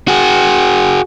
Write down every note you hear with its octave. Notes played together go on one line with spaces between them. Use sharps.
F#4 G#4